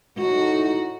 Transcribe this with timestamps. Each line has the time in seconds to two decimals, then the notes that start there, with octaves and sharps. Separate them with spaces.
0.18 A2 D#4 F#4